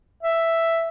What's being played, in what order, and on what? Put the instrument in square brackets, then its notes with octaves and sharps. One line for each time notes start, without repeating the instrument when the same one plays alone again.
[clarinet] E5